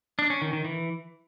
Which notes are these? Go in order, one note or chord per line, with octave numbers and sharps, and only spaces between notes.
D4
C#4
D#3
D#3
E3